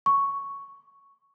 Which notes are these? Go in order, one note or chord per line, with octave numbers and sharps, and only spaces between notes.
C#6